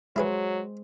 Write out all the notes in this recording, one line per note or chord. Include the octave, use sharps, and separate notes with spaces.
F#3 G#3 E4 G#4 B4 C5